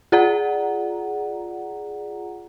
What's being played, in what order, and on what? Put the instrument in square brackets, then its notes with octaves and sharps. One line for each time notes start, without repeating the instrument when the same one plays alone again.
[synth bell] F4 G#4 D5 F#5 A#5